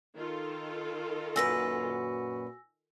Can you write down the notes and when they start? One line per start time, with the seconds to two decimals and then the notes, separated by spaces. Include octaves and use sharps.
0.16 D#3 F4 A4
1.36 F#2 A#2 F#4 B4 G#5 E6 A#6